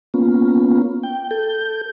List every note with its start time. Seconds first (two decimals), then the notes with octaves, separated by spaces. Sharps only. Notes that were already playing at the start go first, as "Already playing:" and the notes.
0.14 A#3 B3 C#4 F4
1.03 G5
1.31 A4 G6